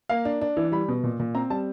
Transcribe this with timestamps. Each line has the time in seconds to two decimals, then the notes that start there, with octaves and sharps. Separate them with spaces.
0.09 A#3 F5
0.25 D4
0.41 D4
0.57 E3
0.72 G3 B5
0.88 B2
1.04 A#2
1.20 A#2
1.35 C4 A#5
1.50 G3 A5